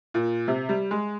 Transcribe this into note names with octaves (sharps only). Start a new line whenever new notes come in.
A#2
C3
G3
G#3